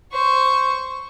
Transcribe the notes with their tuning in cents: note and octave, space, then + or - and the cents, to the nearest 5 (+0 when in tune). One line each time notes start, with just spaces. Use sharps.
C5 -5 C#6 +0